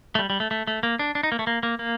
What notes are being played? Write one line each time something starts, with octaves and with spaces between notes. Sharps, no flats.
A3
G3
G3
A3
A3
A3
A#3
D4
D4
D#4
A#3
A3
A#3
A#3
A#3